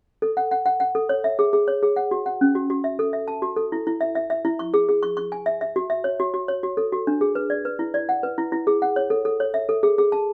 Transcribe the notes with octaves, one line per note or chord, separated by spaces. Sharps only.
A4
F#5
F#5
F#5
F#5
A4
C#5
E5
G#4
G#4
C#5
G#4
F#5
F#4
F#5
C#4
F#4
F#4
E5
A4
E5
A5
F#4
A4
E4
E4
E5
E5
E5
E4
C#6
G#4
G#4
C#6
C#6
G#5
E5
E5
F#4
E5
C#5
F#4
F#4
C#5
F#4
A4
F#4
D4
G#4
B4
D5
B4
E4
D5
F#5
B4
E4
E4
G#4
F#5
C#5
A4
A4
C#5
E5
A4
G#4
G#4
A5